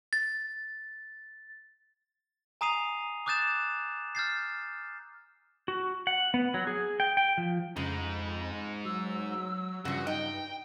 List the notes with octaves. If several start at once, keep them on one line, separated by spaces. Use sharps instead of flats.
A6
G#5 A#5 D#6 C7 D#7 F7
D6 D#6 F#6 G6 A6 E7
F6 G6 A6 C7
F#4
F#5
B3
F#3
G#4
G5
G5
F3
F2 C#3 G#3 D#4 B5
F#3 E6
G2 C#3 F3 F#4
D#4 G5